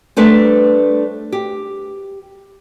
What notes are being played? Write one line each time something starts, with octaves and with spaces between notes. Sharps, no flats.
G3 A3 D4 B4 C5
G4